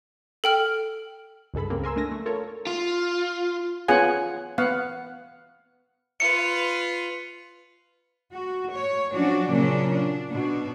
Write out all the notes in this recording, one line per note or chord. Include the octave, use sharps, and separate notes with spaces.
A4 G5 F6
C#2 G2 G#4 A4 B5
C#3 A#3 C4
A#4 G#5 C6 E6
A3 D4 G#5 A#6
A3
F4 A4 A#4 C#5
F4
B3 C#4 F4 G#4 F#5 G#5
B3 F5 F#5
F4 B4 C#7
F#4
C#5
F3 F#3 C#4 D4 F#4
A#2 C#3 F#3 A#3 C#4 D4
D4
B2 D4 F#4